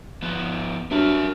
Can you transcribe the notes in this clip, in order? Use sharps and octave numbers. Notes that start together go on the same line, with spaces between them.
F3 B3
G2 F#3 A#4 E5